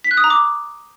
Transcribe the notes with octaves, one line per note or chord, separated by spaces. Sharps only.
B6
F#6
D#6
A#5
D6